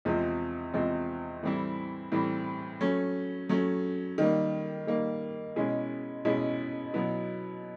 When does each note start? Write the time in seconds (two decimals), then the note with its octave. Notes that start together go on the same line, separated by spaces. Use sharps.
0.05 E2 C3 F3 G#3 C4
0.74 E2 C3 F3 G#3 C4
1.43 A2 E3 G3 C4 E4
2.12 A2 E3 G3 C4 E4
2.81 F#3 A3 C#4
3.49 F#3 A3 C#4
4.18 D#3 G3 A#3
4.87 D#3 G3 A#3
5.56 B2 G#3 C#4 E4 G#4
6.25 B2 G#3 C#4 E4 G#4
6.94 B2 F#3 B3 E4